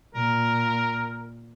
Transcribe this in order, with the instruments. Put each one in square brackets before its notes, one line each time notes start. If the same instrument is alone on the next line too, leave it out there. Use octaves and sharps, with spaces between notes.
[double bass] A#2 [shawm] A#4